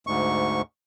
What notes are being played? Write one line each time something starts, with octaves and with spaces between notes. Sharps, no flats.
D2 G#2 C#6